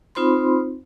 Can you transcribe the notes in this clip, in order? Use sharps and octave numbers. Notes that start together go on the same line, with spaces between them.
C4 D#4 F4 C5 B5 C6